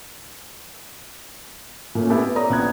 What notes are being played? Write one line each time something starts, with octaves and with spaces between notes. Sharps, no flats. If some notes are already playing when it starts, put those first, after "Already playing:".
A#2 A3 C#4
A3 B3 E4 G4 A4
B4
A4 C#5 D5 A#5 D#6
A#1 B3 F#6 G#6